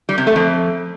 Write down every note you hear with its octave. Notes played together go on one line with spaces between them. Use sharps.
G3
C3
A3
F2